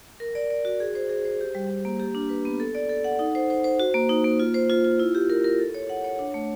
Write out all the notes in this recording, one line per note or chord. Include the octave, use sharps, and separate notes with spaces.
A#4
D5
D5
F#4
G#4
C5
G#4
C5
G4
G3
G3
A#3
G4
D4
B4
B3
A4
D5
A4
F#5
D#4
C5
C5
C5
F#4
A#3
D#4
A#3
F4
C5
F4
F4
E4
G4
A#4
A#4
A4
C#5
F#5
C#5
D4
A3